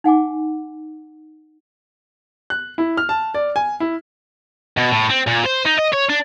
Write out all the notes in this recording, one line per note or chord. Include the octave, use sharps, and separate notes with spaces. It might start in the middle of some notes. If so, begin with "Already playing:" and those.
D#4 F#5 G#5 D6
F#6
E4
F6
A5
D5
G#5
E4
B2
A2
C4
A#2
C5
D#4
D#5
C#5
D4